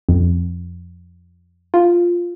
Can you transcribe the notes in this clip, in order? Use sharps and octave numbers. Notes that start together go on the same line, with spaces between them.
F2
F4